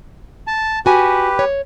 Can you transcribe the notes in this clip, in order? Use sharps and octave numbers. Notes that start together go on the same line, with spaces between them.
A5
F#4 G4 B4 G#5
C#5